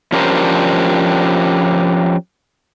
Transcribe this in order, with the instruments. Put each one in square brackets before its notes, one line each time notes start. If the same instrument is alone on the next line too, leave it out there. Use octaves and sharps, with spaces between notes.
[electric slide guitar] F3 C#4 D4 G4 A#4 C5